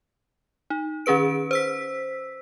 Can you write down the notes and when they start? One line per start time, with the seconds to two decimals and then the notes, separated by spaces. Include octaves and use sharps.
0.70 D#4
1.06 D#3 C#4 G#4 B4 D7
1.51 C5 E6 B6